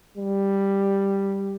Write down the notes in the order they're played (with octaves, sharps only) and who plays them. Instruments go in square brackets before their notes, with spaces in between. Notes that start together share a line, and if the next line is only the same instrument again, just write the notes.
[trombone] G3